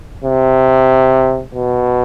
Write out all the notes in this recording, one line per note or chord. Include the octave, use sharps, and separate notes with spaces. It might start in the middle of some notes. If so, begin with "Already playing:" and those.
C3
B2